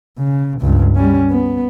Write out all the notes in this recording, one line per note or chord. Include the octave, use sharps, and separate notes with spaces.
C#3
C#2 G2
G3 C#4
B3